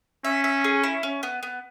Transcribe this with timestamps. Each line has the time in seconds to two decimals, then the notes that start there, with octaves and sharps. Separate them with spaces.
0.25 C#4 E5
0.44 E5
0.64 G#4
0.84 E4
1.03 C#4
1.23 B3
1.43 B3